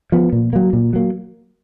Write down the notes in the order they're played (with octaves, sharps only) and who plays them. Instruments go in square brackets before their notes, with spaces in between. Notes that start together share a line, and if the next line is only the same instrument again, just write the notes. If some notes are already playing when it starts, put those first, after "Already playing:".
[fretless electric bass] F3 B3
A#2
F#3 A#3
A#2
F#3 A#3